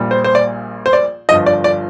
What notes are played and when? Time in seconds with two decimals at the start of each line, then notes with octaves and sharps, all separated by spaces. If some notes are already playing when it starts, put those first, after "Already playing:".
Already playing: A#1 A#2 G3
0.11 C5
0.24 C5
0.35 D5
0.86 C5
0.93 D5
1.29 G1 G2 F3 D#5
1.46 D5
1.64 D5